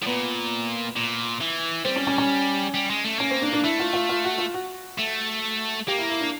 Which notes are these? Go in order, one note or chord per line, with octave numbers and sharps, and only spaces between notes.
A2
A#2 B3
A#2
E3
G3 C4
C#4
C#4
C#4
G3
G#3
A3
A#3 C#4
C4
D4
D4
A3 E4
F4
F4
F4
F#4
F4
F#4
A3
A#3 G4
E4
E4
D4